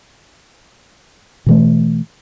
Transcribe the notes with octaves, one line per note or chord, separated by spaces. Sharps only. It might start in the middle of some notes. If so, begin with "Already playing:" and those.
B2 E3 A3